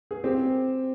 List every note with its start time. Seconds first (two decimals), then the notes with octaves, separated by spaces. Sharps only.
0.11 G#4
0.24 C4 G4